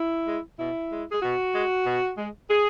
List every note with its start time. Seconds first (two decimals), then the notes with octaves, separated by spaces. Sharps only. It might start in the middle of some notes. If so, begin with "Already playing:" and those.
Already playing: E4
0.25 G#3
0.57 B2 E4
0.89 G#3
1.10 G#4
1.21 B2 F#4
1.53 G#3
1.85 B2
2.16 G#3
2.48 G#4